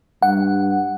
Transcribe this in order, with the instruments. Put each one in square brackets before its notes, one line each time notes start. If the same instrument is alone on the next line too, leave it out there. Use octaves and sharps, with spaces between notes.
[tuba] G2 [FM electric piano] F#5